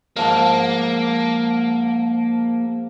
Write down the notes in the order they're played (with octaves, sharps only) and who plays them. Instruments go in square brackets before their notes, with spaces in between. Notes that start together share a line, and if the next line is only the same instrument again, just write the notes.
[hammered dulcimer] G#2 F3 F5 [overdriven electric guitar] A#3